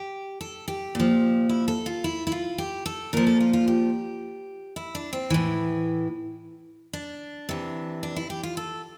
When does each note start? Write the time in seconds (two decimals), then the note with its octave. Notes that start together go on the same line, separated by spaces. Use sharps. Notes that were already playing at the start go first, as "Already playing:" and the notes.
Already playing: G4
0.41 A4
0.68 G4
0.95 A#2 F3
1.49 E4
1.68 A4
1.86 F4
2.04 E4
2.27 E4
2.32 F4
2.58 G4
2.86 A4
3.13 A#2 F3 A#4
3.27 A4
3.40 F4
3.53 F4
3.68 G4
4.76 E4
4.95 D4
5.13 C4
5.30 A2 E3
6.93 D4
7.49 C3 E3
8.03 D4
8.16 E4
8.30 G4
8.43 F4
8.57 A4